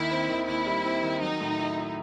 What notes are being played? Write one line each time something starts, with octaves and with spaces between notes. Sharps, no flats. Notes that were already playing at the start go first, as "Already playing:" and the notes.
Already playing: D#2 D#3 E4
C4
D#3
D#2 E4
G3
C4
D#3
F#3 D#4
A2
E4
E4